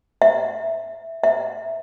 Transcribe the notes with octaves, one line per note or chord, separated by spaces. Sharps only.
E5
E5